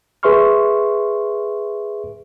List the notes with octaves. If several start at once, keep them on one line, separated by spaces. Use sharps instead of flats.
G#4 B4 E5 C6 C#6 F6